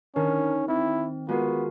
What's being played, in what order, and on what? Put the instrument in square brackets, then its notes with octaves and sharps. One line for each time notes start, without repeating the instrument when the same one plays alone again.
[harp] D#3 [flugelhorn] C#4 [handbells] D4 A#4
[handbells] C4 [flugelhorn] E4
[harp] G#3 [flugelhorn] B3 [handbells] F4 F#4 A#4